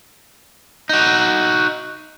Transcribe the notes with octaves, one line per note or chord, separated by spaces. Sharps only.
D#4 F#4